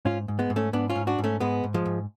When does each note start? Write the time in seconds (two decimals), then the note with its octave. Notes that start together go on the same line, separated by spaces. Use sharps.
0.05 G#2 C#4 F4
0.28 G#2
0.39 G#3 B3
0.50 G#2
0.56 A3 C#4
0.73 G#2 B3 D4
0.90 C#4 F4
0.95 G#2
1.07 D4 F#4
1.19 G#2
1.24 A3 C#4
1.40 G#2 G#3 B3
1.64 G#2
1.74 F3 G#3
1.86 G#2